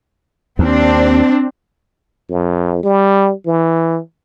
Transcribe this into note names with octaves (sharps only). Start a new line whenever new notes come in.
D#2 C4 D4
F2
G3
E3